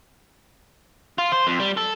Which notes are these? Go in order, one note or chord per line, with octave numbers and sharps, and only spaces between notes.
F4
C5
F2
G3
A4